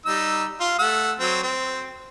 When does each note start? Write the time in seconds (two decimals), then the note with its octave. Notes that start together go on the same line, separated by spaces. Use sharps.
0.06 G3 D#4 E6
0.60 F4 F5
0.79 A3 F#5 E6
1.19 F#3 C4
1.43 C4